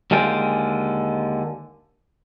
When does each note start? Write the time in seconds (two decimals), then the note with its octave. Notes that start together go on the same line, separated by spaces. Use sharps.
0.11 D#2 D3 G#3 F4 G5